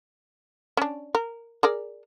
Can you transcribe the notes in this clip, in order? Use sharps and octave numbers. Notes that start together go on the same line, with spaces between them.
C#4 D4
A#4
G#4 A#4 D5